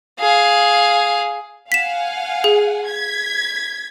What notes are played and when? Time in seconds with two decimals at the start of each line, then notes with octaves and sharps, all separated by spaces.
0.20 G#4 F5
1.72 F5 F#5 G#5 B6 E7
2.44 G#4
2.87 G#6 B6